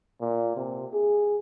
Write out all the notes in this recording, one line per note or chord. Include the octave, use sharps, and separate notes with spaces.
A#2
C3
G#4